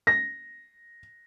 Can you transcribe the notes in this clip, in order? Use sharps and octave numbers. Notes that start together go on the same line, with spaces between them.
A#6